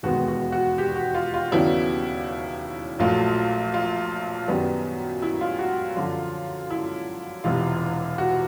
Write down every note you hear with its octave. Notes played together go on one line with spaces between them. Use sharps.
E1 D#2 D#3 G#3 B3 F#4
F#4
F#4
G4
F#4
F4
F4
D#2 C#3 F#3 B3 D4 E4
A#1 A#2 F#3 A3 F4
F4
F#2 D#3 G3 B3
E4
F4
F#4
F#2 D3 F3 F4
E4
E1 E2 C3 F4
F#4